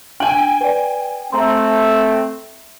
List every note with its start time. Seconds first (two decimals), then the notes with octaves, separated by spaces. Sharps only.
0.20 D4 G5 G#5 F#7
0.61 B4 D5
1.32 A3 C4 E5 A#5 C6